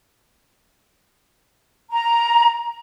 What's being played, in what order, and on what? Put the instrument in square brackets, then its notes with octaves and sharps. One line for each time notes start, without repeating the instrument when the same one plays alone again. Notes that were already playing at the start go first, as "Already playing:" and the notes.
[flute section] A#5